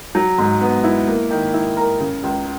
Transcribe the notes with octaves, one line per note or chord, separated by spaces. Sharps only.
F#3
G#2
B3
E4
A#3
D#3
E4
A#4
C#3
C#2